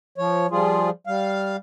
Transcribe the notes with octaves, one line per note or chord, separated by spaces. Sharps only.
F3 C#5
F3 G3 F4 G#4
G3 F5